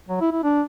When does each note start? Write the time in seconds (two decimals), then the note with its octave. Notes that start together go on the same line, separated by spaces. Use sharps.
0.09 F#3
0.21 E4
0.32 E4
0.44 D4